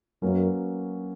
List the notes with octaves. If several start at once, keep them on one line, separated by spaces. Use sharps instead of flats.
F#2 F#3 A#3 C#4 F#4 B4